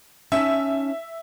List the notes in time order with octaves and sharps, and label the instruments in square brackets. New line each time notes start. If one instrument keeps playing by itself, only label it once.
[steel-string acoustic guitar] C#4 D#4 A5 [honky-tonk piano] E5